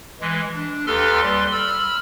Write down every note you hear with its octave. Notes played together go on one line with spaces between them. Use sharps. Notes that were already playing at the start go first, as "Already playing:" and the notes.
E3 G#3
D4
D#2 G4 A4 B4 C6 F6
G3 B4 C6
B5 E6 F6